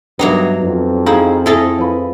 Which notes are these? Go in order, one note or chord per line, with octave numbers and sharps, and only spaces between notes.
G2 F#3 A#3 B3 D#4 E5
F2
D#4 E4 G#4 F5
E4 G#4 A4 D#5
F3 B4